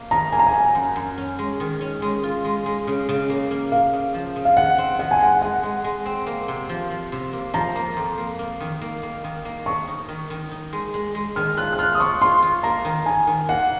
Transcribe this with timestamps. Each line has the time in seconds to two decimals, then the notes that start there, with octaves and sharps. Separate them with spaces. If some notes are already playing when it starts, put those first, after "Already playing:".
Already playing: A#3
0.11 D#3 A#5
0.32 A#3 G#5
0.39 A#5
0.47 G#5
0.53 F#3
0.75 F#2
0.96 F#2
1.18 C#4
1.39 G#3
1.60 D#3
1.81 C#4
2.02 G#3
2.23 F4
2.45 G#3
2.66 G#3
2.87 C#3
3.09 C#3
3.30 A#3
3.51 A#3
3.72 A#3 F5
3.93 C#3
4.14 F3
4.36 C#3
4.45 F5
4.57 D#3 F#5
4.78 C4
4.99 D#3 F#5
5.11 G#5
5.20 G#3 F#5
5.42 G#3 F#5
5.63 G#3
5.84 G#3
6.06 C4
6.27 A#3
6.48 C3
6.69 F3
6.90 F3
7.12 C3
7.33 A#3
7.54 F3 A#5
7.76 A#3
7.97 F2
8.18 A#3
8.39 A#3
8.60 D#3
8.82 A#3
9.03 A#3
9.24 D#3
9.45 A#3
9.66 D#3 C#6
9.88 D#4
10.09 D#3
10.30 D#3
10.51 D#4
10.73 G#3
10.94 G#3
11.15 G#3
11.36 D#3 F6
11.57 F4 F#6
11.73 F#6
11.79 F4 F6
11.95 D#6
12.00 F4 C#6
12.21 F4 C6
12.42 F4
12.63 A#3 A#5
12.85 D#3
13.06 D#3 G#5
13.27 D#3
13.49 A#3 F#5